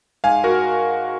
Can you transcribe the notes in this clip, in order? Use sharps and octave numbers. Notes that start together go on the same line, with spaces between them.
G#2 F5 G#5
F#4 A#4